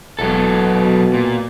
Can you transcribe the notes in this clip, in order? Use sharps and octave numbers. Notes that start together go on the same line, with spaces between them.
E1 B2 F#3 A4
A#2